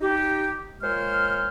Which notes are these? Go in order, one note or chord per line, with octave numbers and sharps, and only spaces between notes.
D#4 G4
A#2 G#3 C5 C#5 F6